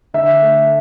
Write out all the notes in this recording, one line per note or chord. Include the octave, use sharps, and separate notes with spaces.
D3 E5
A3